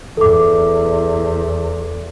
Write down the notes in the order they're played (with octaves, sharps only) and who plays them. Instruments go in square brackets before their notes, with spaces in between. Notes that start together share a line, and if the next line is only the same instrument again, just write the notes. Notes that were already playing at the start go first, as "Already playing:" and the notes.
[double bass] E2 [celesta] A4 D6